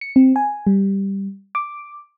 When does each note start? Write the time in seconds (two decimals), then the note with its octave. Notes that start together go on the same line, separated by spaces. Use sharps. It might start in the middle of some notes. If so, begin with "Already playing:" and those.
0.01 C#7
0.16 C4
0.36 G#5
0.67 G3
1.55 D6